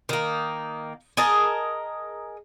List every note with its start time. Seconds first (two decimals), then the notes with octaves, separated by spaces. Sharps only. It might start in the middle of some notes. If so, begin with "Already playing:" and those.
0.09 D#3 A#3
1.17 G#4 A#4 D#5 A5